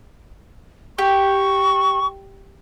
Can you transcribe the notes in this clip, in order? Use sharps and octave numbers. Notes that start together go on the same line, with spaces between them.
G4 C#6